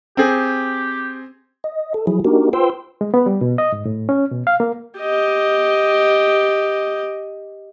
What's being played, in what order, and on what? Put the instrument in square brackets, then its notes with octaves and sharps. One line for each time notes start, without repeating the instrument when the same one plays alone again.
[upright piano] C4 G#4 [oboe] G4
[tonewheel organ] D#5
A4
F3 F#3 E4 G#4
A#3 D4 D#4 F#4 G4 A#4
F4 B4 C5 G5 C6 E6
[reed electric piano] G#3
B3
G3
B2
D#5
G#2
A2
C#4
B2
F5
A#3
[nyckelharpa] G4 D#5